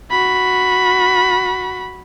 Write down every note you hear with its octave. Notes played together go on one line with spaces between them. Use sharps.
F#4 B5